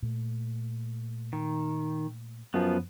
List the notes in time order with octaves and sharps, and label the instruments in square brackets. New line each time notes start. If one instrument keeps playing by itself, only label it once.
[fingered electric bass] A#2 A3
[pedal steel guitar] D#3
[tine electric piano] F#2 F3 [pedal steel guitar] B3